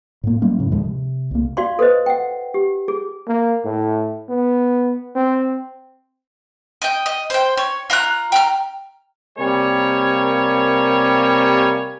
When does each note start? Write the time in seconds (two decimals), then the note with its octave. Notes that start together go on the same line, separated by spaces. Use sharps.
0.24 A2 A#3
0.42 F#3 G3 A#3 C#4
0.59 F#2 A2 C#3
0.72 D2 F3 G#3
0.85 C3
1.31 C2 A#3
1.57 F#4 D5 F5 C6
1.79 A4 B4 C5 D#5
2.06 F#5 G5
2.54 G4
2.88 G#4
3.28 A#3
3.65 A2
4.29 B3
5.15 C4
6.82 D#5 G5
7.06 D#5
7.30 C5 G5
7.57 C#5
7.90 F4 A#5 C6 F#6
8.32 G5 A#5 F6
9.38 C3 G3 A#3 A#4 C#5 G#5